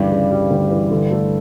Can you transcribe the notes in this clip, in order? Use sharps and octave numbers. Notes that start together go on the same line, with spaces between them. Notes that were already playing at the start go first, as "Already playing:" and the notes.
Already playing: D2 G2 C#3 E3 G3
C#3
G3
D2
E3
D3
A3